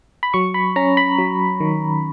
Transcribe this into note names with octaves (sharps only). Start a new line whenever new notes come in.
B5
F#3 C#6
B5
C#4 A#5
B5
F#3
D#3